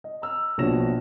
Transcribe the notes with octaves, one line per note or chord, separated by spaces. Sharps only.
D#5
A#5 E6 F6
A#1 B2 D4 C#5 A#6 E7